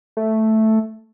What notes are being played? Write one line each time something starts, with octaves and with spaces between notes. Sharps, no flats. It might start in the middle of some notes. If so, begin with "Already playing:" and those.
A3